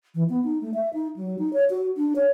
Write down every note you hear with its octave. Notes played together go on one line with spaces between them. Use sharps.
E3
B3
D#4
A3
E5
D#4
F#3
D#4
C#5
F#4
D4
C#5